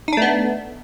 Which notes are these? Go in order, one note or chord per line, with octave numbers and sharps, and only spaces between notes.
A3 B3 D4 D#4